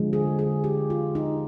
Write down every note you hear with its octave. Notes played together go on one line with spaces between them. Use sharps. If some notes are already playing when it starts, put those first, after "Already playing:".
Already playing: D3 F3 G#3
G#4
G#4
G4
F4
D#4